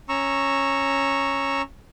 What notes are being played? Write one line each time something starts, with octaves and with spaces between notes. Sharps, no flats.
C#4 A#5 C#6 E6